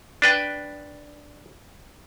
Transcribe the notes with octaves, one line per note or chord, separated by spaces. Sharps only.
D4 B4 G5